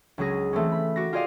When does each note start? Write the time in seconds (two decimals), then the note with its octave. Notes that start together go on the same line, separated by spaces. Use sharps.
0.18 C#2 F#3 C#4 G#4 A#6
0.53 E3 A3 C4 C#4
0.72 B5
0.96 F#4 D6 A#6
1.13 F4 G4 G#4 D5 D#5 F5